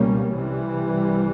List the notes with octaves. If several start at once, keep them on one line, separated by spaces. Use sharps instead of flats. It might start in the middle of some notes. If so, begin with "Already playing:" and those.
Already playing: C#2 B2 G3 A#3 C#4
C2 C3 E3 G3